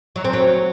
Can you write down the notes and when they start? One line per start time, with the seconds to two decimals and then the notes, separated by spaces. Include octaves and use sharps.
0.16 F#3
0.24 C4
0.33 F#3